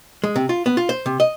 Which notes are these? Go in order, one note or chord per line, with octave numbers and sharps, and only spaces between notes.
G#3
C3
F4
B3
F4
C5
C3
D#5